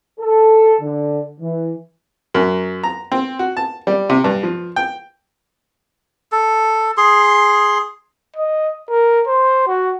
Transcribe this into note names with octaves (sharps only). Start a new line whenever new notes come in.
A4
D3
E3
F#2
A#5
C4
F#4
A5
G3
C3
G2
F3
G5
A4
G#4 C6
D#5
A#4
C5
F#4